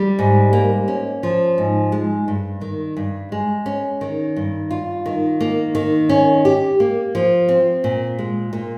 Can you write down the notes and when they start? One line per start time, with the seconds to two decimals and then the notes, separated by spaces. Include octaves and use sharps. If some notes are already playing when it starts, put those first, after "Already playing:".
Already playing: G3
0.19 G#2
0.53 A#3
0.88 C#4
1.23 F3
1.58 G#2
1.92 G#3
2.28 G2
2.61 D#3
2.97 G2
3.32 G#3
3.66 C#4
4.01 D#3
4.36 G2
4.71 F4
5.06 D#3
5.41 A#3
5.75 D#3
6.09 C#4
6.45 G4
6.80 A#3
7.15 F3
7.49 C4
7.84 A#2
8.19 G#3
8.53 A#2